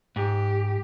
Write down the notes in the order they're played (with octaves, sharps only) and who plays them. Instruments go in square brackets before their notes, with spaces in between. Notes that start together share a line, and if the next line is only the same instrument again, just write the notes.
[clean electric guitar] G#2 [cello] G4